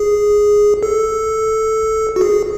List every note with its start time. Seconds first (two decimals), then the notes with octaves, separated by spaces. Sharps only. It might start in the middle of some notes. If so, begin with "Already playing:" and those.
Already playing: G#4
0.83 A4
2.16 F#4
2.21 G#4